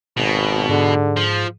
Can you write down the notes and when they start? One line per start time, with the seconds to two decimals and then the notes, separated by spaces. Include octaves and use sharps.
0.17 G#1 B2
0.69 G#2 D3 G#4
1.17 F3